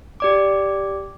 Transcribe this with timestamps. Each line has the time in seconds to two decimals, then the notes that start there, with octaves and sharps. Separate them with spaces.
0.20 G4 D5 D6